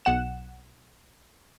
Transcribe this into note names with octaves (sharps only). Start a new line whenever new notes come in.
B1 F#5 E7